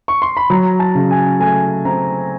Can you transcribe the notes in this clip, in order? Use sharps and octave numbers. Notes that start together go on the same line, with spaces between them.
C#6
C6
B5
F#3 A#5
A5
C#3
G#5
A3 G#5
C4 A#5